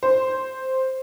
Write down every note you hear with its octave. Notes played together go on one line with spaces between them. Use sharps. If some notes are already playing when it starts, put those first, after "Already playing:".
C5